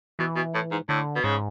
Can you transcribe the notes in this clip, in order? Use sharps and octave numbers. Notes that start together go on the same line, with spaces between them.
B2 E3
B2
A2
G#2
A2 D3
B2
G#2 C#3